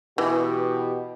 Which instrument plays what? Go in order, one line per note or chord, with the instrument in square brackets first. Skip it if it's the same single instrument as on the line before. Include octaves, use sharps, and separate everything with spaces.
[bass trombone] B2 [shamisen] E3 [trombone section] G4